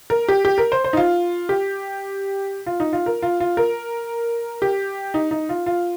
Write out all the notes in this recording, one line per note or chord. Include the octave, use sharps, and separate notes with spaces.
A#4
G4
G4
A#4
C5
C5
D#4
F4
G4
F4
D#4
F4
A#4
F4
F4
A#4
G4
D#4
D#4
F4
F4